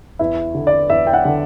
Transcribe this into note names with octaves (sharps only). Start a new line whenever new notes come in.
E2 E4
D3
D5
E2 E5
G5
F#5
D3